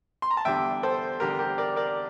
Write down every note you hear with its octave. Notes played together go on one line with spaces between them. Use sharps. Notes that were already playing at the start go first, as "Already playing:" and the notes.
C6
A#5
A5
E2 D3 G3 D4 E5 G5
A4 C5
E2 D3 G3 D4 G4 A#4
G4 A#4
A#4 D5
A#4 D5